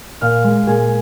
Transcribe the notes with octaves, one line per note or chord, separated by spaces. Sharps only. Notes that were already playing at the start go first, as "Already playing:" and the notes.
A#2 F5 F6
G#3
A#2 G#4 G#5